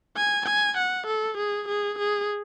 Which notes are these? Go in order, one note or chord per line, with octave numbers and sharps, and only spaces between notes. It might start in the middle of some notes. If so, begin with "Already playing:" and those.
G#5
G#5
F#5
A4
G#4
G#4
G#4